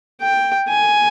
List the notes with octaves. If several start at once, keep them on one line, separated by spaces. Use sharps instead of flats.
G5
G#5